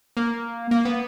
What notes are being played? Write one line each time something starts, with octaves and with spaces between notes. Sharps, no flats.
A#3
A#3
B3